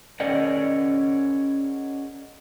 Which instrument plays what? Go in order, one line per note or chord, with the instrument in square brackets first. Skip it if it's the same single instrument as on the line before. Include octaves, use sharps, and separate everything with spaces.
[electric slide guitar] C#4 G#4 A#4 D5 D#5 F#5